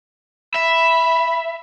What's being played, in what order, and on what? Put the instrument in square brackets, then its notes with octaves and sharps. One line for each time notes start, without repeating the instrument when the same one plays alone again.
[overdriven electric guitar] E5 [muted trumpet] B5